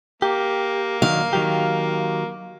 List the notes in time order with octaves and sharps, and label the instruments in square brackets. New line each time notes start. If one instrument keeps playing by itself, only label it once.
[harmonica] A#3 [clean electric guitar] G4
[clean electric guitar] D#3 F#3 [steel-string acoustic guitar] F5
[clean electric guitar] D#3 F#3 G4